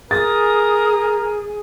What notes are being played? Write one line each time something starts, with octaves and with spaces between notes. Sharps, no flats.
G#4 A#4 D#6 A6